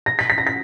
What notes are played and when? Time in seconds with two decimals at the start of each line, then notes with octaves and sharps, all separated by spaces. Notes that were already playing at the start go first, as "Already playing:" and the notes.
0.06 A#6
0.19 B6
0.30 B6
0.38 A#6
0.47 B6